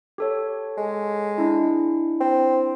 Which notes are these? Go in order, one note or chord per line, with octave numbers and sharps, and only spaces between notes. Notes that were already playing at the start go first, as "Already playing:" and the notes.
G4 A4 C#5
G#3
D4 E4
C4